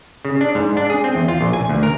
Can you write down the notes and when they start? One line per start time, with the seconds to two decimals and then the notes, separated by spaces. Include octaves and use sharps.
0.25 C#3
0.41 D4
0.55 G#2
0.77 D4
0.90 G#4
1.04 C4
1.15 E2
1.28 F4
1.41 A#1
1.53 G#5
1.69 D2
1.83 A#4